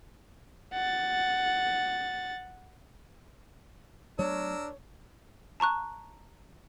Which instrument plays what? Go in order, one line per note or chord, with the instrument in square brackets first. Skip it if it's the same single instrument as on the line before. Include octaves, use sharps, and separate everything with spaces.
[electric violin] F#5 A6
[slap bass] F#3 A3 B3 [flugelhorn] D4 [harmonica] A#4 E6 [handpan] C#5
[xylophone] A5 A#5 C#6 F#6